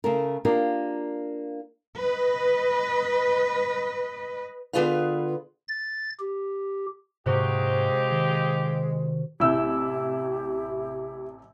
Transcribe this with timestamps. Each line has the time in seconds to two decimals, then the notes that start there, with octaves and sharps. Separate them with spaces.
0.04 C#3 A3 A#4
0.45 A#3 D4 F4 G4 G#4 A#4
1.97 B4 D#5
4.73 D3 B3 F4 G#4 B4 F5
5.68 A6
6.19 G4
7.26 G#2 C3 F3 G#3 D#4 F#4 G4
8.11 D#3
9.40 A1 C3 E4 G4 E6 G6